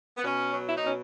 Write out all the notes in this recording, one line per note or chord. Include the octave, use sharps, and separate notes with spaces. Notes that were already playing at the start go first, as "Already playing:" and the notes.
B3
B2 C#4
F#3
E4
D#4
B2 C#4